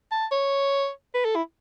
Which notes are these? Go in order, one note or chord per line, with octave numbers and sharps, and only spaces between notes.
A5
C#5
B4
A4
E4